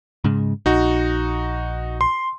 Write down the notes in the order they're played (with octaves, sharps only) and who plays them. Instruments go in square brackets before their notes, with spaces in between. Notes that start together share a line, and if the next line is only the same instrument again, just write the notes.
[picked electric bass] G#2 C#3 G#3
[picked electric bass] A#1 [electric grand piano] D#4 F#4
[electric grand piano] C6